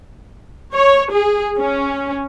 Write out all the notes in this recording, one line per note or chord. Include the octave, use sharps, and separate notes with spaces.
C#5
G#4
C#4